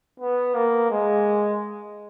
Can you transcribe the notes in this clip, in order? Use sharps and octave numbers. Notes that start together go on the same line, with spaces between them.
B3
A#3
G#3